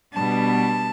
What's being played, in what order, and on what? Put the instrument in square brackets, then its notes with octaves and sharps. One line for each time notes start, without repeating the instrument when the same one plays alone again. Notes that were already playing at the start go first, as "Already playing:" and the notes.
[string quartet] B2 G3 B3 D4 A5